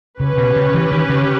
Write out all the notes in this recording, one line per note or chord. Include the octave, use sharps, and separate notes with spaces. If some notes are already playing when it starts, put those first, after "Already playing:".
C#3 C#4 G4 B4
B2
C#3
E3
D#3
C#3